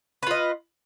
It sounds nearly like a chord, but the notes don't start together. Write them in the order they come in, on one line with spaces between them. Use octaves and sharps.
B4 F4 D#5